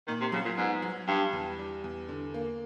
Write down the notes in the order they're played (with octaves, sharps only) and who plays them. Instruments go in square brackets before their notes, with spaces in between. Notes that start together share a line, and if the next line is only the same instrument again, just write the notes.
[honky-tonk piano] A#2 [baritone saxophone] D#3
[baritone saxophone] C3
[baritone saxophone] C#3 [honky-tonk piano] F#3
[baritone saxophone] A#2
[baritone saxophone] G#2 [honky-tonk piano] B3
[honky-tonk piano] F#3
[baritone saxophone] G2 [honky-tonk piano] G3
[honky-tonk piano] E2
G3
E2
D3
A#3